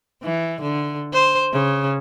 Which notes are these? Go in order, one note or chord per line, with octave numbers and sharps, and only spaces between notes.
E3
D3
C5
C#3